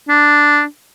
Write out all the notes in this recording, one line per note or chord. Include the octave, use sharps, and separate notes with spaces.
D4